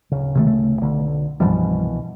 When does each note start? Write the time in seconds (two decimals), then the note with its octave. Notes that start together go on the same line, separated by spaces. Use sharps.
0.11 D1 C#3
0.35 C3 D#3 A3
0.47 A3
0.81 B1 D3
1.40 C2 G2 B2 E3 F3 G3